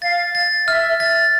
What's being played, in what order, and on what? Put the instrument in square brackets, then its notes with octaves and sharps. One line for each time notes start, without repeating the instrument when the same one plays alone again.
[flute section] F5 [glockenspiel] A6
[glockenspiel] A6
[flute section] E5 [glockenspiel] F6
[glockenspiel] A6